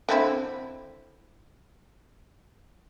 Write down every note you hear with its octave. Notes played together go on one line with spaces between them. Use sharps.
D3 C4 E4